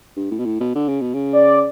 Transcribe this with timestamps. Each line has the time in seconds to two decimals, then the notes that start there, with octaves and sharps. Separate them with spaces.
0.16 G2
0.31 A2
0.39 B2
0.46 A2
0.60 B2
0.75 D3
0.89 C#3
1.01 B2
1.14 C#3
1.33 D5